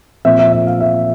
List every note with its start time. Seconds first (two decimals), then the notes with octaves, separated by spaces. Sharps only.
0.25 A#2 F3 C4 E5
0.39 E5
0.53 E5
0.66 F5
0.81 E5